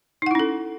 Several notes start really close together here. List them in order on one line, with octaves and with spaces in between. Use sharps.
D#4 F#5 E4 C#4 A4